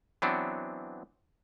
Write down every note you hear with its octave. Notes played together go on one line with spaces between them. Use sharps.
E3 F#3 B3 C4 D4